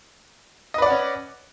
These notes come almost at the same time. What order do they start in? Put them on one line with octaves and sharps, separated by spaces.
D#5 B4 D5 F#5 C#4